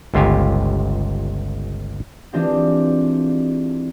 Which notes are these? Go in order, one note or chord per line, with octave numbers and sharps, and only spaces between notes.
G1 C#2 F4 G4 G#5
E3 G#3 C4 D4 F4 G4